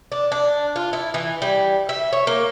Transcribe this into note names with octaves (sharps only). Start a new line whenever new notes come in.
D4
D4
F4
E4
E3
G3
E5
C#5
A#3